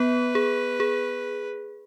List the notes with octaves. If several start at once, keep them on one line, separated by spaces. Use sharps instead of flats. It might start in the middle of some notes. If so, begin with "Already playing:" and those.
Already playing: B3 B4
G#4
G#4